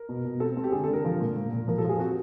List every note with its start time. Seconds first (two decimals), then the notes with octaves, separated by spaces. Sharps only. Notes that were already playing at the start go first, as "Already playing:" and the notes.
Already playing: A#4
0.09 B2
0.25 B2
0.40 C4 A4
0.57 C4
0.64 G4
0.72 D3 G#4
0.84 D3 A4
0.93 A#4
1.05 F3
1.21 A#2
1.36 A#2
1.53 A#2
1.68 F3 A#4
1.78 A4
1.84 F3 G#4
1.99 C4 F#4